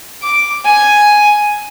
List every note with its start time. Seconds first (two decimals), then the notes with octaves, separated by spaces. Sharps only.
0.23 D6
0.66 G#5